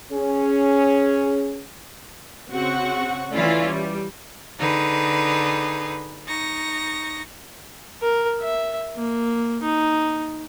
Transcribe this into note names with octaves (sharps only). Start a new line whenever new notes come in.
C#4 G#4
C#3 C4 F#4 F#5 C#6
E3 A3 C#4 E4 F4 D5
G3
D3 D#4 G#4 B4
D#4 C#6 A#6
A#4
E5
A#3
D#4